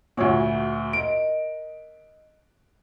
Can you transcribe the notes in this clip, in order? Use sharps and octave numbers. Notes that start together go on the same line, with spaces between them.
D2 A#2 F#4 G#4 C#5
A#4 D#5 D7